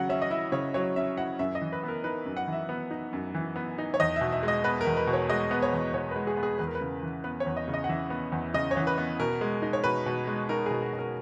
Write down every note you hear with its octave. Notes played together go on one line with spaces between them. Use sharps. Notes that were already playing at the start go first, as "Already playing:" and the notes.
Already playing: C#3 F#3 F#5
C#4 E5
D#5
E4 E5
C#3 C#5
F#3 C#5
C#4 E5
E4 F#5
F#2 E5
D#5
E3
B4
B3 A#4
D#4 B4
F#2
F#5
E3
E5
B3
D#4
F#2
E3
B3
D#4
C#5
E2 D#5
B2 E5
E5
G#3
D#5
B3 B4
A#4
E2
B4
B2
C#5
G#3 D#5
B3 B4
C#5
E2
B2 C#5
G#3 B4
G#4
B3
G#4
E2 B4
A#4
B4
C#3
E3
B3 B4
C#5
E2
D#5
C#3
D#5
F#5
E3 E5
B3
E2
C#3 D#5
C#5
E3
B4
B3
B2 A#4
G#3
D#4
C#5
B2 B4
B2
G#3
D#4 A#4
B2 G#4
F#4
B2
A#4